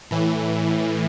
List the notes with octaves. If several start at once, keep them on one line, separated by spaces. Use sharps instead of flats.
A2 E3